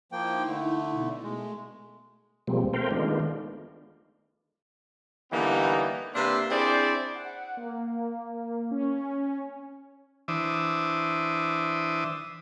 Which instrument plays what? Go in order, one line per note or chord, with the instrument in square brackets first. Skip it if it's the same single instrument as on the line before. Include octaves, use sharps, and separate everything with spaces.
[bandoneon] F3 A#3 G5 [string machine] D#4 E4
[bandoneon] D3 A3
[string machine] B2
[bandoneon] G#3 [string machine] A3
[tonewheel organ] B2 F3 G3 G#3 A#3 C4
A3 C4 A#4 C5 F5 G5
D#3 G#3 A3 B3 D4 F4
[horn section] D3 E3 G3 A#3 B3 D#4
C3 A#3 D4 B4 E5 C6
C4 D4 E4 G#4 C5 D5
[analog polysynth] F#5
A#3
C#4
[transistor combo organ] E3 D4 C5 E5 D6 D#6